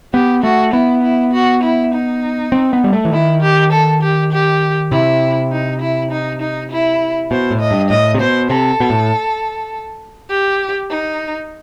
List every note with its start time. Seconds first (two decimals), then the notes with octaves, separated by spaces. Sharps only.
0.13 B3 G4
0.43 A3 F#4
0.73 B3 E4
1.03 E4
1.33 F#4
1.63 E4
1.93 D#4
2.52 C4
2.73 B3
2.84 G3
2.93 A3
3.05 E3
3.12 D#3 E4
3.42 G4
3.72 A4
4.02 G4
4.33 G4
4.92 C3 E4
5.52 D#4
5.81 E4
6.11 D#4
6.41 D#4
6.71 E4
7.31 B2 C5
7.51 A2
7.60 D#5
7.71 G2
7.90 A2 D#5
8.15 C3
8.20 B2 C5
8.50 C3 A4
8.80 B2
8.90 A2
10.30 G4
10.90 D#4